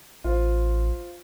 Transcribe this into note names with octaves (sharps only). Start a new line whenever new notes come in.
A1 F4 C5